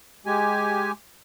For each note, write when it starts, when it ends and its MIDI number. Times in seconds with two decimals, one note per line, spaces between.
0.26 0.92 56
0.26 0.92 67
0.26 0.92 80